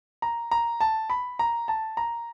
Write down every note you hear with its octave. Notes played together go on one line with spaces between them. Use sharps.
A#5
A#5
A5
B5
A#5
A5
A#5